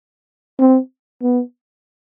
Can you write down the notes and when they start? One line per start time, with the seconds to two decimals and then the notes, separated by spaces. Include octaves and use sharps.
0.59 C4
1.22 B3